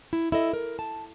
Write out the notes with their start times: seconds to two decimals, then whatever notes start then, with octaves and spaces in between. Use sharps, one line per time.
0.13 E4
0.32 E4 A4 D#5
0.53 A#4
0.79 A5